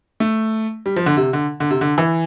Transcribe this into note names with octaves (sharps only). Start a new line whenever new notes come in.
A3
G3
F3
D3
C3
D3
D3
C3
D3
E3